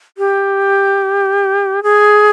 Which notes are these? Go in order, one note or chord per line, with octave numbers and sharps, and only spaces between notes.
G4
G#4